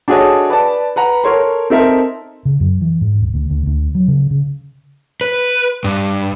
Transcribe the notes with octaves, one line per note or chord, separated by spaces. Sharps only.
D4 F#4 G#4 A4 C#5 D#5
B4 D5 A5
B4 F#5 A#5
A4 A#4 C#5 C6
C4 D#4 A4 A#4 E5
C#3
F#2
E3
G#2
D#1
D2
D2
D2
F#3
C#3
C#3
B4
G2